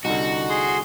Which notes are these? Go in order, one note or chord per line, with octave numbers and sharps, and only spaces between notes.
C2 D3 D#4 F#4
G#4 C6